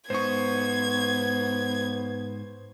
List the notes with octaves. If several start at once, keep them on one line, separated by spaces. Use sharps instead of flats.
G#2 B3 D#4 C5 C#6 G#6